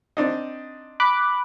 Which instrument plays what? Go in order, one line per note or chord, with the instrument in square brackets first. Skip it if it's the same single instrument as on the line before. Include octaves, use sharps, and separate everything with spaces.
[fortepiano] C4 D4 D#4
[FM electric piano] B5 D6 F#6